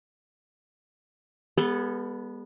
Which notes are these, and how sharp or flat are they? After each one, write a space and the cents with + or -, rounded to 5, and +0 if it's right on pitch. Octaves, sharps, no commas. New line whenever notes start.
G3 +45 B3 -15 A4 +0